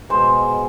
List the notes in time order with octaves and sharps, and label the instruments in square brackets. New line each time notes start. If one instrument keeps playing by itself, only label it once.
[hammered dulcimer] B2 G#3 C5